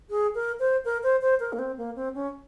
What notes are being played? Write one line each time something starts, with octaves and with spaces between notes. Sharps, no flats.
G#4
A#4
C5
A#4
C5
C5
A#4
A#3
C4
A#3
C4
C#4